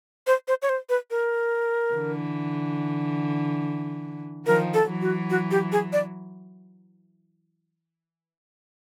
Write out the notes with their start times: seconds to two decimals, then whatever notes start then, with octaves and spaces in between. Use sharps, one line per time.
0.27 C5
0.48 C5
0.62 C#5
0.69 C5
0.90 B4
1.11 A#4
1.94 D3 E3
4.46 D#3 F3 A#4
4.74 A4
4.88 E3 F#3
5.02 F#4
5.30 F#4
5.51 G4
5.72 G#4
5.93 D5